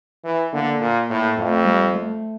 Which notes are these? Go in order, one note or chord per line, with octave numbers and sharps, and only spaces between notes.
E3
D3 A#3
A#2
A2
F2 A3
G3
A3